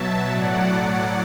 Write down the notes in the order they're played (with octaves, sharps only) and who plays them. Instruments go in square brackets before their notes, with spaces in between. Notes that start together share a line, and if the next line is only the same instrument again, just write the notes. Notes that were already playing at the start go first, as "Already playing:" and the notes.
Already playing: [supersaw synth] B2 F#3 E5 A5
A2 F#3 D5 F#5